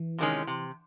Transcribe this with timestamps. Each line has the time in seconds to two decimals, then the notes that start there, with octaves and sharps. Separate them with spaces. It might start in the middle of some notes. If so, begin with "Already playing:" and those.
Already playing: E3
0.18 C3 D#3 G#3 C#4
0.47 C3